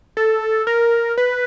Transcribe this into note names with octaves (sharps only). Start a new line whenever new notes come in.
A4
A#4
B4